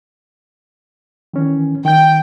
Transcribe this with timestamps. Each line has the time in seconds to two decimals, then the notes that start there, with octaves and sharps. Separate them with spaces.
1.34 D#3 E3 C#4
1.85 D#3 G5 G6